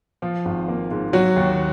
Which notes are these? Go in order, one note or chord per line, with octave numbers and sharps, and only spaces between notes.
F3 F4
G#1
A#3
G#2
F#3 F#4
D#2